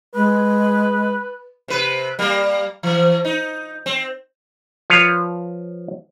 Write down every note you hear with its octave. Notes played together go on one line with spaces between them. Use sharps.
G#3 B4
C3 B4
G3 A#3
E3
D#4
C4
F3 B4 C#5 F5